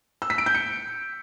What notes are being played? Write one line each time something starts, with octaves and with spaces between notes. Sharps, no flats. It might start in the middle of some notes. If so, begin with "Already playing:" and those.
E6
B6
D7
G6
C#7